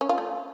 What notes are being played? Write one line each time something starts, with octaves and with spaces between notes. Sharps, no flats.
C#4
F4
A3